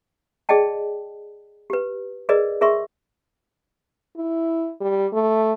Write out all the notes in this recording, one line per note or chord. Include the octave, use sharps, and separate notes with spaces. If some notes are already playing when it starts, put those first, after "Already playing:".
G#4 D5 D#5 G5 A5
G4 B4
G#4 A#4 B4 D5 D#5
G#4 A#4 E5 C6 C#6
E4
G3
A3